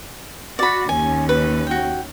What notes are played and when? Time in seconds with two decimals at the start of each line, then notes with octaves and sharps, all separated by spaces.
0.59 F#4 D5 B5
0.89 D#2 C#4 G#5
1.29 B4
1.67 F#4 G5